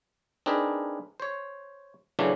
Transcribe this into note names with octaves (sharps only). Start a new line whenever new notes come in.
C4 D4 D#4 G#4 A#4 B4
C5 C#5
A2 C#3 E3 F#3 C#4 D4